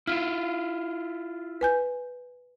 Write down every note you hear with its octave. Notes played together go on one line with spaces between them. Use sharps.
E4 F4 F6
B4 G#5 G6